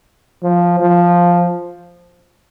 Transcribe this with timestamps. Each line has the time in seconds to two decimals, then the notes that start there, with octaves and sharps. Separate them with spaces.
0.43 F3
0.80 F3